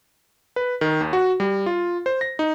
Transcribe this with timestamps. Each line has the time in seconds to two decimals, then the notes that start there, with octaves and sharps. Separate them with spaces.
0.56 B4
0.81 D#3
1.01 D#2
1.13 F#4
1.40 G3
1.66 F4
2.06 C5
2.21 A#6
2.39 D#4